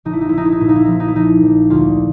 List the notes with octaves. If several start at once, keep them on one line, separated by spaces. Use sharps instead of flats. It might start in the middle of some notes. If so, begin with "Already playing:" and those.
A#1 D#4
E4
D#4
A#1 E4
D#4
E4
D#4
A#2 E4
D#4
E4
F3 D#4
E4
D#4
E4
A#1 D#4
A#1
D2 F4